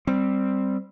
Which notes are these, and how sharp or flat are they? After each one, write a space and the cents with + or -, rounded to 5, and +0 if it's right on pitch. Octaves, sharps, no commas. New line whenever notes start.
G3 +0 C4 +0